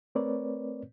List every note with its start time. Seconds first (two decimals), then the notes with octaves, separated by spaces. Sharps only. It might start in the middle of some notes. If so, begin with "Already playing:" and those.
0.15 A3 C4 A#4 B4 C#5 D5